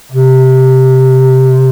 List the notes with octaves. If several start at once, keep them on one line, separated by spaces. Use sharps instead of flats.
C3